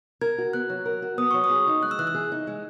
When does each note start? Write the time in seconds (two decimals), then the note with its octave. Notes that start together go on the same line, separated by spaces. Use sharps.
0.21 A#4 G#6
0.38 F#4
0.53 B3 F#6
0.70 F#3
0.86 A#4
1.02 F#4
1.18 B3 D#6
1.31 F#3 C#6
1.44 D#6
1.50 G#4
1.67 D#4
1.83 G#3 F#6
1.91 E6
1.99 E3 F#6
2.07 E6
2.15 G#4
2.32 D#4
2.47 G#3